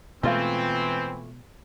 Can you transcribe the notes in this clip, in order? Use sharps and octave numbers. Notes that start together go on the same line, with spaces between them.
B2 E3 G#3 A3 C4 F4 F5